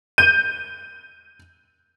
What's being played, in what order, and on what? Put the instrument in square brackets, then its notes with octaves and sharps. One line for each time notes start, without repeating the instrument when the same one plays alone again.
[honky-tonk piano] G6 D#7